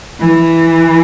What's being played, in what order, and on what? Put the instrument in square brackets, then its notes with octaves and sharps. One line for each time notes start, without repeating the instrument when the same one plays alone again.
[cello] E3